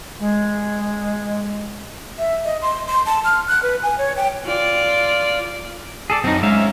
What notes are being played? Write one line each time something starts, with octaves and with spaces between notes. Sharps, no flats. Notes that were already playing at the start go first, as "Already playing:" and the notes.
G#3
E5
D#5
C6
C6
A5
F6
F#6
B4
G#5
C#5
G5
F4 D5
G#4 A4 D5
F#2 C4 D#4
G#2 C#4 E5 F5